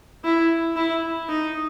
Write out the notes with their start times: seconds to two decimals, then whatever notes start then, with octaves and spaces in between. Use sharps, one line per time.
0.24 E4
0.76 E4
1.28 D#4